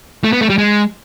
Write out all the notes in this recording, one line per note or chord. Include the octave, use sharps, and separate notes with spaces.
A3
B3
A3
G3
G#3